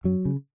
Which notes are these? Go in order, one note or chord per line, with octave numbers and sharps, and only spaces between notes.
F#2 F#3
C#3